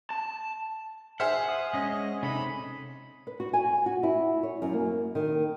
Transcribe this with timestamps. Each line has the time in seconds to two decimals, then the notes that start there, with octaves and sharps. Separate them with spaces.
0.10 A5
1.20 G#4 C5 E5 F#5 F6
1.49 D#6
1.73 G#3 C#4 D#5
1.91 D#5
2.23 C3 C#4 D#4 A4 B5
3.27 B4
3.40 F#4
3.53 G#5
3.86 F#4
4.03 E4
4.43 C#5
4.62 F#2
4.73 A#3
5.15 D#3